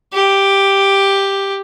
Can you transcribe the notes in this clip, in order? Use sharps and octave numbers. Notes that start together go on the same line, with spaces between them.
G4